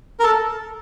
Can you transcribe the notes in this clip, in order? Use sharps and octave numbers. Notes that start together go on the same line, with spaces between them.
A#4
A4